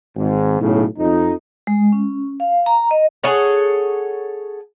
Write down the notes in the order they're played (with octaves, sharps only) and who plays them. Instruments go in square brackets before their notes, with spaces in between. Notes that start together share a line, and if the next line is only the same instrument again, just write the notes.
[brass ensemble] G#1 G#2
B1 A2 C#3
F2 D#4
[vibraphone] G#3
C#4
F5
A#5
D#5
[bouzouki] G#4 A4 C#5 F#5